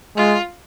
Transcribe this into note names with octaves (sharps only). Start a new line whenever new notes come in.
G#3 F4